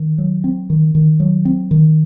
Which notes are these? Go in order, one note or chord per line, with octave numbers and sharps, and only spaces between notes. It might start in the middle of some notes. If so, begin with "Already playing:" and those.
Already playing: D#3
F#3
C4
D#3
D#3
F#3
C4
D#3